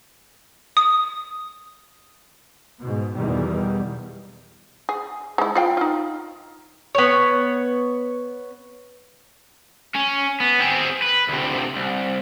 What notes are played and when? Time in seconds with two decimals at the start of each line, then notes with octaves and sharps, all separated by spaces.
0.77 D#6
2.82 G#2 B2
3.14 E2 B2 D#3 G3
4.89 G#4
5.38 G#3 E4
5.55 F4 F5 G5
5.77 D#4 F4
6.95 B3 C#5
9.95 C#4
10.40 B3
10.60 C4 G#4
11.02 B4
11.29 D2 C3
11.75 C2